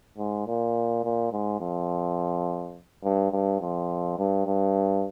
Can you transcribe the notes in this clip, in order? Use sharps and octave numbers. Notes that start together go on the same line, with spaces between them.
G#2
A#2
A#2
G#2
F2
G2
G2
F2
G2
G2